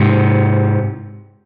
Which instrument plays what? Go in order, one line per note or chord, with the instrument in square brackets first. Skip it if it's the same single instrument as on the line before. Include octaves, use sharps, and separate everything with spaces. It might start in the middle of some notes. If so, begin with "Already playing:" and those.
Already playing: [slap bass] G#2 C3